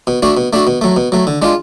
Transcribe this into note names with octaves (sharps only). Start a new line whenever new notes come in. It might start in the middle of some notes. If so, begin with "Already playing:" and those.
B2
A3 D4 F#4
B2
A3 D4 F#4
B2
F#3 A3
B2
F#3 A3
D3
G#3 D4 F4